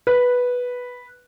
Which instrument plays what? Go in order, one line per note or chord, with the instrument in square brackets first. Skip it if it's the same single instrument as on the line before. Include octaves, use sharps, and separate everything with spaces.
[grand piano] B4